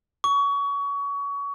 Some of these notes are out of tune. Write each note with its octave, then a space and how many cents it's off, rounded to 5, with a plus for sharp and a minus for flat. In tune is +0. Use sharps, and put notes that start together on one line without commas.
C#6 +30